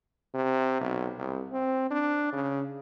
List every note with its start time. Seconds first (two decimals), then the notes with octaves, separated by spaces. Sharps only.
0.34 C3
0.81 B1
1.18 C2
1.53 C4
1.91 D4
2.33 C#3